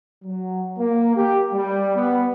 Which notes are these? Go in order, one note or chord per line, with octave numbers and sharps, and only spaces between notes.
F#3
A#3
G4
G3
B3